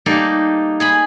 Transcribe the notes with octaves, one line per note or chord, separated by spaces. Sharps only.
G3 A#3 D#4 G4 A4
G#4 G#5 B5